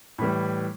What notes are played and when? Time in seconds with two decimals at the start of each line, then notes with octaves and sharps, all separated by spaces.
0.18 A2 E3 G3 B5